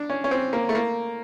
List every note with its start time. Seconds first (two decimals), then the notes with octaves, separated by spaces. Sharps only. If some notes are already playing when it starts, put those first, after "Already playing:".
Already playing: D4
0.10 C#4
0.24 C#4
0.31 C4
0.53 A#3
0.69 A3
0.75 A#3